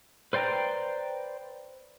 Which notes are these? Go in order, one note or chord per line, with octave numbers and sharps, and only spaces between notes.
B4 C5 D5 G5 A#5